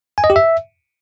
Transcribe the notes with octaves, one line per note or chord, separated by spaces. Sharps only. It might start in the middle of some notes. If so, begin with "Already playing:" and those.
G#5
D#5
G4
E5